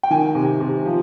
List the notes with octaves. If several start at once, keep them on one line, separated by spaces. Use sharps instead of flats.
G5
D#3 G#5
C3
C3
F3